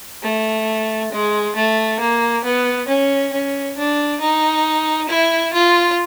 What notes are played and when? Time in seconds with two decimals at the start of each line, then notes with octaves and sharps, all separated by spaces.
0.23 A3
1.12 G#3
1.56 A3
2.00 A#3
2.44 B3
2.88 C#4
3.33 C#4
3.77 D4
4.20 D#4
5.09 E4
5.53 F4